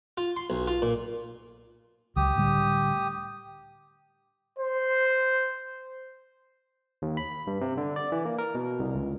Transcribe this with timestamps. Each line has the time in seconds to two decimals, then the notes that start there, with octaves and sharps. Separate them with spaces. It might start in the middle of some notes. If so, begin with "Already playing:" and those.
0.17 F4
0.37 C6
0.50 B1
0.67 F4
0.82 A#2
2.16 C#2 F#3 G4 D#6
2.36 A2 D3 G3
4.59 C5
7.02 D#2
7.17 B5
7.47 G2
7.61 C3
7.77 D3
7.96 D5
8.12 E3
8.25 A#3
8.38 A#4
8.55 B2
8.79 C2
8.95 C#2